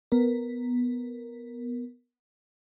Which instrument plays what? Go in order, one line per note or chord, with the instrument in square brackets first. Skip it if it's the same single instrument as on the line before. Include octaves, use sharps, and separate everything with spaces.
[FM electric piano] B3 A#4